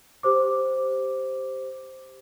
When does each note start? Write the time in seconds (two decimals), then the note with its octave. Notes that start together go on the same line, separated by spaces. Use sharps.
0.23 G4 C5 D6